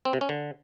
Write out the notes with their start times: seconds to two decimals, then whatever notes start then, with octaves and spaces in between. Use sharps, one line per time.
0.05 C4
0.13 C3
0.21 C#4
0.29 D3